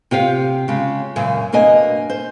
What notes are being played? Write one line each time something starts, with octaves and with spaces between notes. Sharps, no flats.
C3 F4 G4 F5
C#3 G#3
F#2 A#2 C#3
B2 A#3 D4 D#5 G#5
C5